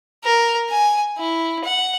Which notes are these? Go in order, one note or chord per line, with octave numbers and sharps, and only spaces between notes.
A#4
G#5
E4
F#5